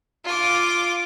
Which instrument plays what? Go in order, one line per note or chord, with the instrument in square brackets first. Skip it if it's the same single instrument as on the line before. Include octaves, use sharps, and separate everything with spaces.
[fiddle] F4 D6